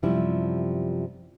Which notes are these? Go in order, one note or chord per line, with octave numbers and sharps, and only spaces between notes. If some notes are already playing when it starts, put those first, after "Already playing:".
F#2 C3 F3 G3 E4